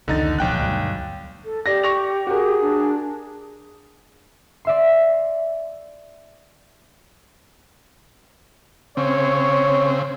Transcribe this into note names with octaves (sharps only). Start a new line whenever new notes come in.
F1 C#2 D3 D#3 D#4 A6
D1 B1 F3 G5 F#6
D2 G2
A4
G4 D5 A#6
C#6 A#6 F7
F#4 G#4 A#4
D4
D5 E5 C6
C#3 C4 C#5